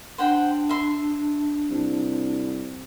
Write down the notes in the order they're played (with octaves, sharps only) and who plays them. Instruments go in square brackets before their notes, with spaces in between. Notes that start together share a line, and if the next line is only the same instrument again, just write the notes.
[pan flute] D4 [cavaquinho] C5 F#5 G5
[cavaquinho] E5 C6
[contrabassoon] C2